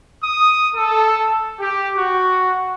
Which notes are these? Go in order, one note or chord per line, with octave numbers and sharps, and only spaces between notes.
D#6
A4
G4
F#4